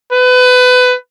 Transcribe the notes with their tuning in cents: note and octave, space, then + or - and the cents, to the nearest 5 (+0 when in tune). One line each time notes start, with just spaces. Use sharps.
B4 +25